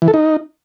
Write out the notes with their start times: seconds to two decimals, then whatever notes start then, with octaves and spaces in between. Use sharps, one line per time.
0.02 E3
0.08 A4
0.14 D#4